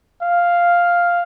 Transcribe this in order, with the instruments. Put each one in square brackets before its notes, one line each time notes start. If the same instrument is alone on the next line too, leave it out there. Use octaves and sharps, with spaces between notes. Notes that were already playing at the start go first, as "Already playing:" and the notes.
[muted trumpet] F5